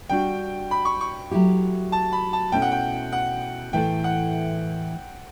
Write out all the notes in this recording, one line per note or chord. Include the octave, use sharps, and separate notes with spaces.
G3 D4 F#4 G5
B5
C#6
C#6
F#3 A3 E4 G4
A5
B5
A5
B2 A3 C#4 E4 G5
F#5
G5
F#5
A2 E3 A3 E4 A4 G5
F#5